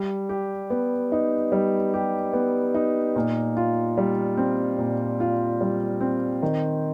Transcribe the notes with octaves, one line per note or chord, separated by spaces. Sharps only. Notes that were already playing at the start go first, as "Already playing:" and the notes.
Already playing: G3
G4
B3
D#4
G3
G4
B3
D#4
A#2
F4
G3
C4
A#2
F4
G3
C4
D#3